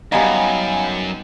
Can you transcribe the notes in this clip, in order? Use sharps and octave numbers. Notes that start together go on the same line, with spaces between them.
F#2 G3 B3 D#4 F5 G#5 B5